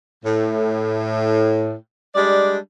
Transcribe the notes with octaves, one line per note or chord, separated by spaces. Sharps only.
A2
G3 G#3 D4 D5